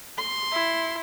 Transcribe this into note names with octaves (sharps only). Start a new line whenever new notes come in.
C6
E4